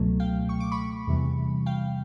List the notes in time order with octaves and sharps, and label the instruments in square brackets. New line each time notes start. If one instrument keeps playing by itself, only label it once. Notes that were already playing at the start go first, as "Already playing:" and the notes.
Already playing: [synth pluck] C#2 B2 F#3 A3
F5 G5
C#6
D6
B5 C#6
E2 C3 E3 G3
F5 G5